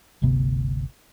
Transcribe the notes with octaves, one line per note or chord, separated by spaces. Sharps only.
G1 D2 C3 B3